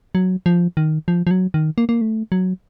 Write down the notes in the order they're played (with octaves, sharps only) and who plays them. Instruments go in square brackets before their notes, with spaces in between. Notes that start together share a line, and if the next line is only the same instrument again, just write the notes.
[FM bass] F#3
F3
D#3
F3
F3
F#3
D#3
A#3
A#3
A3
F#3